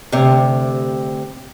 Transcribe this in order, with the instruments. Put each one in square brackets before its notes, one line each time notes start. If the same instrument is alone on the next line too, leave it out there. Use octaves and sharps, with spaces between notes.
[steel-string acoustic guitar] D2 C3